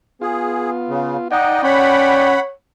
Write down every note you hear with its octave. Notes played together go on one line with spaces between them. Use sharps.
B3 F4 G#4
C#3
D#4 D5 D#5 F#5 G5
C#4 C#5 F#5 B5